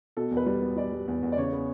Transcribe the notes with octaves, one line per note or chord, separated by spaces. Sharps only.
B2 A4
E2
B4
G3
B3
G3 D5
G3
E2
E2
D5
C#3 C#5
B3